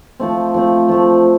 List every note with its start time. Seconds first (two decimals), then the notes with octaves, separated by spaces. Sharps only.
0.20 F3 A3 C4
0.54 F3 A3 C4
0.89 F3 A3 C4